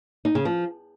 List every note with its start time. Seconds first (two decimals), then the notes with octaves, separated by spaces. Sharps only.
0.25 D#4
0.35 C#3
0.45 F3